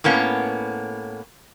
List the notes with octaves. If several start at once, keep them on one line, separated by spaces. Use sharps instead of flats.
A2 A#3 B3 C#4